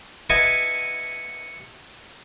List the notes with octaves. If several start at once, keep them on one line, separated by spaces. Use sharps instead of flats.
E4 B4 D#5 F#5 G#5 A5